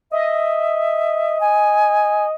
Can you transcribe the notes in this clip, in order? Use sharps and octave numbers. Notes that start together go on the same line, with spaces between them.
D#5 E5
G#5